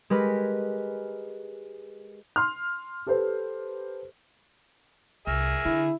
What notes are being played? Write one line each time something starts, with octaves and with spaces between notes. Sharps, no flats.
G#3 G4 A#4 B4
C6 F6
G4 A4 B4 C5
C2 G#4 A#4 E5
D3 E4